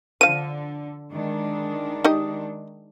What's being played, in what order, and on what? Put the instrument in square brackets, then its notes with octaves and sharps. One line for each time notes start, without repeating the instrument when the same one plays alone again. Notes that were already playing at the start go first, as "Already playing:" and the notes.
[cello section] D3 [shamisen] F3 F5 [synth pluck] D#7
[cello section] D#3 G#3 D4
[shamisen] D#4 G4 D#5